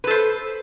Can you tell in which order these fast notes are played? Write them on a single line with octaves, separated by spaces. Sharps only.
B4 A4 C5